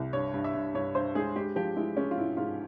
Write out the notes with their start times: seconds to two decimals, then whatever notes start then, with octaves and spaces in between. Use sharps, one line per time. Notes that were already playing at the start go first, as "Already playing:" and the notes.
Already playing: C2
0.13 G2 C#5
0.34 G2
0.44 E5
0.55 G2
0.74 G2 C#5
0.95 G2 C5
1.15 G#3 G#4
1.36 G#3 G4
1.56 F3 G4
1.76 G#3 E4
1.97 G#3 C#4
2.11 F4
2.17 G#2 E4
2.37 G#2 F4